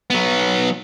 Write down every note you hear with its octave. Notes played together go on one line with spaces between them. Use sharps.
F#3 B3